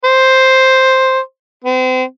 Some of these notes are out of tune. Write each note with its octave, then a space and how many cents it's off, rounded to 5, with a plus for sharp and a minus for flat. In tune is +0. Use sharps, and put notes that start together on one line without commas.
C5 +5
C4 -35